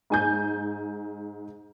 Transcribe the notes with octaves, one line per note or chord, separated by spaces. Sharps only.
G#2 G#5 G6